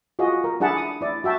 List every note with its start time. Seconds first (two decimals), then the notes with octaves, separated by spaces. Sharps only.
0.19 F4 F#4 G#4 D#5
0.44 A#4
0.60 D4 E4 G#4 F#5 A5 B5
0.77 D#6
1.01 E4 D5
1.24 F#4 E5 G5 A5